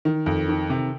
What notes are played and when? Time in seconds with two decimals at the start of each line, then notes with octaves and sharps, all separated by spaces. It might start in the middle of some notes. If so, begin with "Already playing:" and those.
0.05 D#3
0.26 F2
0.48 D#3
0.70 C3